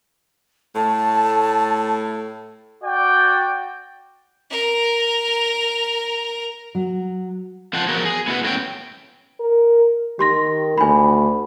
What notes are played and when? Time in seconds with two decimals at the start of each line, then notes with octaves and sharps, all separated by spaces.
0.76 A2 A3 A5
2.83 F#4 D5 G5
4.50 A#4 A#5
6.75 F#3
7.73 F2 F3 C5 F#5 A5
7.88 F3 F#3 B3 F#4 G#4 A#4
8.05 G#4
8.28 B3 E4 F#4 A#4 B4
8.44 A2 F#3 C#4 G5
9.40 A#4
10.19 D#3 G4 C6 A#6
10.78 D2 G#5 B5